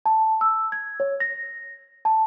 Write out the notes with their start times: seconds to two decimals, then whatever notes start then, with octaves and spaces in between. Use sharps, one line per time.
0.06 A5
0.41 E6
0.72 G#6
1.00 C#5
1.20 A#6
2.05 A5